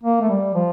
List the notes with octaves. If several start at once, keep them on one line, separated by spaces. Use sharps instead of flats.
A#3
A3
G3
F3